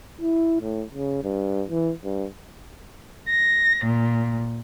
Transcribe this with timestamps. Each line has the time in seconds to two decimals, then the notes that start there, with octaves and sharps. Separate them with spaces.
0.21 E4
0.62 A2
0.94 C#3
1.24 G2
1.70 E3
2.04 G2
3.29 A#6
3.84 A#2